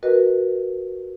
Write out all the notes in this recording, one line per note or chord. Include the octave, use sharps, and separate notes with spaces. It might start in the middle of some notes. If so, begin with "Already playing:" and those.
F#4 A#4 B4 D#5